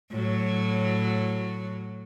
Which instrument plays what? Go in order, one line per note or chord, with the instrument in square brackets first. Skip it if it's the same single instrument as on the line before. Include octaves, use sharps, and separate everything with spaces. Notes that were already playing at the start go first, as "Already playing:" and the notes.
[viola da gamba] A2 F#3